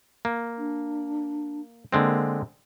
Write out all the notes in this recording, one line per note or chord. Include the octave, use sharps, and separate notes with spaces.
A#3
D4
D3 G#3 A#3 C4